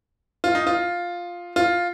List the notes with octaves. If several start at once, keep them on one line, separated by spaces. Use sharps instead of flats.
F4
D#4
F4
F4